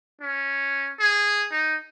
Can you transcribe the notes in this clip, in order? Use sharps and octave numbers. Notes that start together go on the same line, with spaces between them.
C#4
G#4
D#4